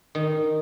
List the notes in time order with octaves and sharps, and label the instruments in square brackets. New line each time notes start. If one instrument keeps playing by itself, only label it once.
[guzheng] D#3